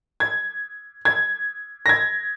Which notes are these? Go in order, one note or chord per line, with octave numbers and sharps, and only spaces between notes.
G#6
G#6
A#6
G#6